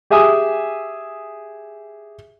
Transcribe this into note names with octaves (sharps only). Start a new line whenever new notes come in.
G4 G#4 E5 G#5 D#6